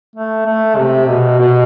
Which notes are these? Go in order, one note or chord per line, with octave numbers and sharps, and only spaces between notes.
A3
A3
C3
B2
B2